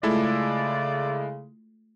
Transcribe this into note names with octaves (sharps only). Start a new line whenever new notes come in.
C#3 G#3 A3 E4 F4 A4 D5